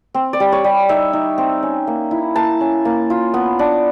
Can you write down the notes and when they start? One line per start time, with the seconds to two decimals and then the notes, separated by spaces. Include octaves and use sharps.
0.14 C4
0.33 D5
0.40 G3
0.52 C#5
0.64 G3
0.89 D#4 E5
1.13 D#4
1.38 C4
1.63 C#4
1.87 A#3
2.11 E4
2.36 A#3 A5
2.61 C#4
2.85 A#3
3.10 F4
3.34 B3
3.59 D4